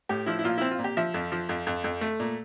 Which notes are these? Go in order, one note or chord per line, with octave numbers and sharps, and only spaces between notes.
A2 G4
F3 E4
E4
A#2 F4
C4 E4
F4
A#2
G4
F3 E5
F2
F3
F2
F2
F2
A3
A#2